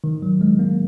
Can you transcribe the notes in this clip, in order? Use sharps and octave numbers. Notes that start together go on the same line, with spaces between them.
D#3
F#3
G#3
A#3